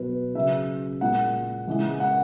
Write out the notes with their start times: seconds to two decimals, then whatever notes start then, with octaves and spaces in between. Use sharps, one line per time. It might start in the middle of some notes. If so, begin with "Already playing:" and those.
Already playing: B2 F#3 B4
0.35 C#3 F#3 E5
1.01 A#2 G#3 F#5
1.67 C#3 E3 G#3
2.00 F#5